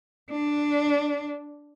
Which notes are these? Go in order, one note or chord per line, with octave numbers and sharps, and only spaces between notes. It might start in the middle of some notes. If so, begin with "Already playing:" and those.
D4